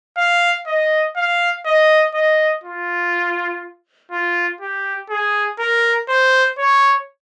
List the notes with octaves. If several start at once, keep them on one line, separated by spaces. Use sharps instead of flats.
F5
D#5
F5
D#5
D#5
F4
F4
G4
G#4
A#4
C5
C#5